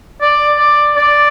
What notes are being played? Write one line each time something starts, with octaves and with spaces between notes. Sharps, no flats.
D5
D5
D5